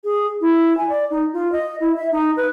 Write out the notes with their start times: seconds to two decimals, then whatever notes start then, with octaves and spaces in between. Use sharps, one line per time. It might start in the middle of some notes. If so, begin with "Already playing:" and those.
0.04 G#4
0.41 E4
0.78 G#5
0.90 D5
1.11 D#4
1.33 F4
1.52 D#5
1.80 E4
1.97 E5
2.12 D#4
2.37 B4